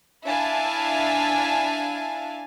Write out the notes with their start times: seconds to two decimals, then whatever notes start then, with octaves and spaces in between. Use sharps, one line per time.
0.25 D4 E4 E5 F5 G#5 A5